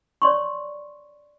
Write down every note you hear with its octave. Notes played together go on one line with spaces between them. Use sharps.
C#5 D5 C6 C#6